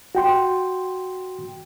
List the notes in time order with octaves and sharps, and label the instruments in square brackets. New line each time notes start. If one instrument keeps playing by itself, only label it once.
[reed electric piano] F#4 G5 C6